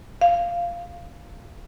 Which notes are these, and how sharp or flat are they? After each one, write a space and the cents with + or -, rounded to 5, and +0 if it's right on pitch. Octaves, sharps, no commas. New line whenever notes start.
F5 -10